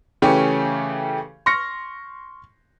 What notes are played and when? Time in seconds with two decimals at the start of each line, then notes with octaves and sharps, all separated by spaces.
0.22 C#3 E3 A3 C#4 G4
1.46 C6 C#6 F6 A#6 C#7